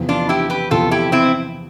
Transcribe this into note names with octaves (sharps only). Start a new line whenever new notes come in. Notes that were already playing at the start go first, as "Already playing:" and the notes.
Already playing: E2 C3 F3 B3
D4 F4
E4 G4
G4 B4
E2 C3 F3 B3 F4 A4
E4 G4
C4 E4